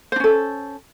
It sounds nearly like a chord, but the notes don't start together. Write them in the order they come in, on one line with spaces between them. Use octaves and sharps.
C5 D4 C#4 A4